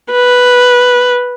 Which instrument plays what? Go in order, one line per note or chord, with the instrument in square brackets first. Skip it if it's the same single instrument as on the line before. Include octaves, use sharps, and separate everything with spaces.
[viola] B4